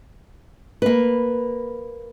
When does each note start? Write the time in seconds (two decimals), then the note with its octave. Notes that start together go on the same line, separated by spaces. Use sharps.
0.82 A#3 B4